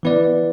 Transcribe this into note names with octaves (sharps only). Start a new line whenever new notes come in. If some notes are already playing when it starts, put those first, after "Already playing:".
E3 B3 E4 B4 D5